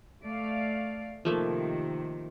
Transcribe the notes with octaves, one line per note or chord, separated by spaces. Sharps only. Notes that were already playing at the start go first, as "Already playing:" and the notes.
A3 D5 F5
C3 D#3 F3 A3 A#3